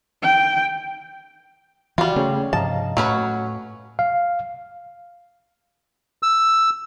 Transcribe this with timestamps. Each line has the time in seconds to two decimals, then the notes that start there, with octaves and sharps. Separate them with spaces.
0.22 G5
1.98 E3 G3 F4 F#4 F#5
2.16 C#3 A3 C#4 G#4 C#5
2.53 G2 C3 F3 D#5 F5 A5 A#5
2.97 A2 F#3 A3 C#4 B4
3.99 F5
6.23 E6